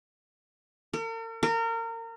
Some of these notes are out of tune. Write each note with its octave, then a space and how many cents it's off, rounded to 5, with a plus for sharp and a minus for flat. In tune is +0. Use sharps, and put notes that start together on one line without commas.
A#4 -45
A#4 -30